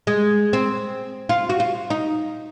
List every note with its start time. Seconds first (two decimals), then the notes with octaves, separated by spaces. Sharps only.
0.07 G#3
0.53 C4
1.29 F4
1.50 F#4
1.60 F4
1.90 D#4